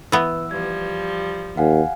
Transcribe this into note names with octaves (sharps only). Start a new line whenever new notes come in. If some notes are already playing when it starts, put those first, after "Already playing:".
E3 B3 E6
F3 G3 G#6
D#2 F5 F#5 G#5